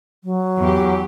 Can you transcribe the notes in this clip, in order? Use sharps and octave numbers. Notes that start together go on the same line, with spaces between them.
F#3
E2 G4